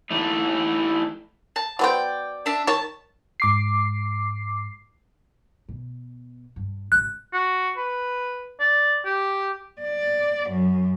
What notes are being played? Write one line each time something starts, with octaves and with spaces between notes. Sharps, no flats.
E3 A3 D#4
A5
F#3 B3 C5 D5 G5
D4 E5
D#3 C#5 A5
G#2 D6 C7
B2
G2
G#1 C#3 F#6
F#4
B4
D5
G4
D5
F#2